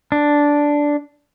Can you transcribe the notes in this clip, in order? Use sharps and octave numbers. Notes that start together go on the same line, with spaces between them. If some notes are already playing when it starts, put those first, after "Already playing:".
D4